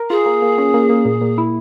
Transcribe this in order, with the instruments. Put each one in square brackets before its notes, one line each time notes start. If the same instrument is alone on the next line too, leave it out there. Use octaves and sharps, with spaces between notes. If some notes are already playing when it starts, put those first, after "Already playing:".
Already playing: [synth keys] A#4
[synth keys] F4 [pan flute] G#4
[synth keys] A#3
A#3
C#4
A#3
A#3
A#2
A#2
E4